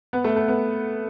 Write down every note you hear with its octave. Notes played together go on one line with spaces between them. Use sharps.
B3
A3
A3
B3